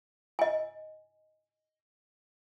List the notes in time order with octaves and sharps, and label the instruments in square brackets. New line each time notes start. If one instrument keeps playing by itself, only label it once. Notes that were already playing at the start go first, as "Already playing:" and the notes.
[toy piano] D#5 G#5